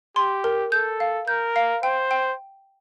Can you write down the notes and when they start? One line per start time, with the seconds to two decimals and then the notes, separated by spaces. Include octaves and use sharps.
0.16 G4 C6
0.44 A#4
0.72 A4 G6
1.00 F5
1.27 A#4 G6
1.56 F5
1.83 C5 G5
2.11 G5